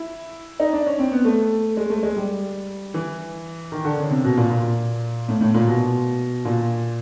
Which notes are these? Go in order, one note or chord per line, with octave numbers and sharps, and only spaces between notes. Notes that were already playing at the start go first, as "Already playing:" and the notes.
Already playing: E4
D#4
D4
C#4
C4
B3
A3
G#3
A3
G#3
G3
E3
D#3
D3
C#3
C3
B2
A#2
A#2
A2
A2
A#2
B2
A#2